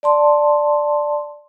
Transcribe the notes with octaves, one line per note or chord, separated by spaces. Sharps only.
D5 A5 C6